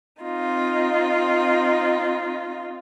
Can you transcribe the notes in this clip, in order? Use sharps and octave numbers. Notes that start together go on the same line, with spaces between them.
C4 D#4 F4